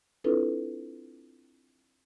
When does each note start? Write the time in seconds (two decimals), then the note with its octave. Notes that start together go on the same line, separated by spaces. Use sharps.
0.24 C4 D4 E4 F4 A4 B4